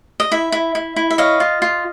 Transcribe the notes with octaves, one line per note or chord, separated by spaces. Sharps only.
D#5
E4 E5
E4
E4
E4
E5
C#5 D#5 F5
F4
F4